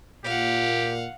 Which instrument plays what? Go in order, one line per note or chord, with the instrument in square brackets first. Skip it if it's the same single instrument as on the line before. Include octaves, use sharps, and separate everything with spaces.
[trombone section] A#2 [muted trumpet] G4 [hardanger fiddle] F5 F#5